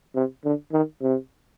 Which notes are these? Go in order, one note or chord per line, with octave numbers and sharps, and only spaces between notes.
C3
D3
D#3
C3